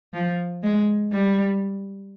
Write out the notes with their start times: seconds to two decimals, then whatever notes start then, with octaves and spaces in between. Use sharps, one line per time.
0.14 F3
0.63 G#3
1.12 G3